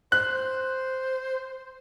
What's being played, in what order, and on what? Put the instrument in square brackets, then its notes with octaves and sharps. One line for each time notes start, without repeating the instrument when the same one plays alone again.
[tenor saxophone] C5 [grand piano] F#6